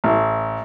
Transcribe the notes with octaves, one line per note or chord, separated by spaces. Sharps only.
A1